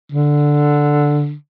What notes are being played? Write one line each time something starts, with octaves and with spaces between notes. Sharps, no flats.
D3